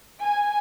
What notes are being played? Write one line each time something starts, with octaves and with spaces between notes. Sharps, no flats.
G#5